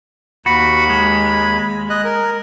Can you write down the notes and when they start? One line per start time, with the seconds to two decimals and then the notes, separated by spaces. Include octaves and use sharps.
0.46 D#2 F#4 B5
0.90 G#3
1.90 D#5 F#6
2.04 A#4